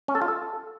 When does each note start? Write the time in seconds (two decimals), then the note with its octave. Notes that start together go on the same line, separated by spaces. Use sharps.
0.08 C#4
0.15 A4
0.22 F4
0.28 A4